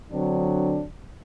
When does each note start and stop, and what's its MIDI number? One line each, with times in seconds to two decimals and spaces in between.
0.12 0.82 50
0.12 0.82 54
0.12 0.82 60
0.12 0.82 62